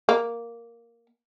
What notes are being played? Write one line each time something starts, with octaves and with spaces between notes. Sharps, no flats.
A#3